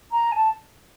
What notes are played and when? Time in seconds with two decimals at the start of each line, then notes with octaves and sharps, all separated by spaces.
0.12 A#5
0.32 G#5
0.35 A5